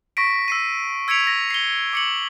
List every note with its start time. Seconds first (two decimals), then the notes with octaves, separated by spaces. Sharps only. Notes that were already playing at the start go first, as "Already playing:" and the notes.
0.17 C#6 A#6 B6 D7
0.48 E6 C7 D#7
1.08 E6 G#6 B6 C#7 D7 F7
1.27 A#6
1.50 C7 G7
1.93 D6 C#7 F#7